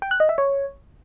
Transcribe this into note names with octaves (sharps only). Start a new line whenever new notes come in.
G5
F#6
D#5
E5
C#5